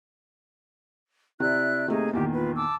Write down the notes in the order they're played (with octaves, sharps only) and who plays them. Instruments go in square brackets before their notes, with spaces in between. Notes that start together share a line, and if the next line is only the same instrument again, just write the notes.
[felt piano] C3 [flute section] E4 D5 F#6
[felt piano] C3 A3 A#3 [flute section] D#4 G#4
[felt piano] E2 A#2 D#3 [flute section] G4
[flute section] F4 B4
A5 D6 E6